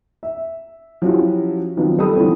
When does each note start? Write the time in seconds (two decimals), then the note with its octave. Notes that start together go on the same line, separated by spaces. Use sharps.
0.23 E5
1.02 F3 F#3 C#4 E4 F#4 G4
1.77 D#3 F3 F#3 B3 C4
1.98 G3 A4 A#4 B5 D#6
2.15 D3 E3 F3 B3 C4